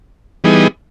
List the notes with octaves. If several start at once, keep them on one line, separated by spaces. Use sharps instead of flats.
E3 G3 B3 D#4 G#4